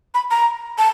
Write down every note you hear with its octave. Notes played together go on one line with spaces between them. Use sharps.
B5
A#5
A5